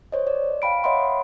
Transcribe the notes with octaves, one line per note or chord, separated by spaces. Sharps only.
C5 C#5 D#5
D5
F5 G5 B5 D7
C#5 D#5 E5 F#5 B5 C6